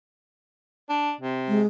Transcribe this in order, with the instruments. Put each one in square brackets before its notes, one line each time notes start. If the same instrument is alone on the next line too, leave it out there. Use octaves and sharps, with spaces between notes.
[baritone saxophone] D4
C3
[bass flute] G#3